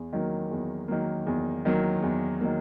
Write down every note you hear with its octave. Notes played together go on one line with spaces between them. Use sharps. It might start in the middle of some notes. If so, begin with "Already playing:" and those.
Already playing: E2
D#3 F#3 A#3
E2
D#3 F#3 A#3
E2
D#3 F#3 A#3
E2
D#3 F#3 A#3